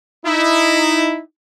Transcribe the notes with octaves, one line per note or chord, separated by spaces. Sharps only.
D#4 E4